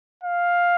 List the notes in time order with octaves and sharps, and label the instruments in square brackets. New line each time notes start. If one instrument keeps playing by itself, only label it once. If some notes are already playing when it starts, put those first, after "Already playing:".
[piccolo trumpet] F5